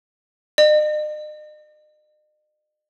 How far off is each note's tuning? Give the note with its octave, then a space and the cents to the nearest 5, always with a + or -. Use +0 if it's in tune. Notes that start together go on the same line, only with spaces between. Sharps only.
D#5 -45